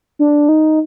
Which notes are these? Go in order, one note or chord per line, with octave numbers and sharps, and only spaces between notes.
D4
D#4